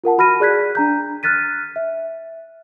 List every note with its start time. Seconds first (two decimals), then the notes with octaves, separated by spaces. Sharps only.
0.04 F4 A#4 F#5 A5
0.18 F#4 B5 F6 A#6 D#7
0.40 G#4 D5 F#6 G#6 B6
0.75 D4 A#5 G6
1.23 F6 F#6 A6 B6 D#7
1.76 E5